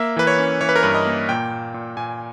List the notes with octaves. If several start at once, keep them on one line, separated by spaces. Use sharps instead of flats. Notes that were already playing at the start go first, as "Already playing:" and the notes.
Already playing: A#3 E5
E3 B4
C#5
C#4
E3 C#5
B4
A#4
G2 B4
D#5
A#3
A#2 G5
A#2
A#2
A#2 G#5